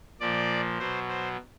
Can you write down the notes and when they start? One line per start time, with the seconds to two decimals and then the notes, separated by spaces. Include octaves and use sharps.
0.20 A#2 F3 D5
0.79 B2 F#3 C5
1.08 C5